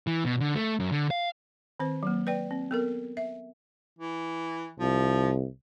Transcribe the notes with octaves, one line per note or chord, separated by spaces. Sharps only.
E3
B2
D3
A3
F#2
D3
F5
D#3 C4 C5
F#3 A#3
B4 D5 G5
C4
B3 A4 A#4
E5
E3
C2 F3